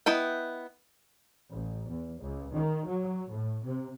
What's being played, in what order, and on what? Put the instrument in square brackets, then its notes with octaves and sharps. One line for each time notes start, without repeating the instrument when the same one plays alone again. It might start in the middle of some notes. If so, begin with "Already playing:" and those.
[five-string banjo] B3 E4 D#5 G5
[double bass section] A1
E2
C#2
D#3
F#3
A2
C3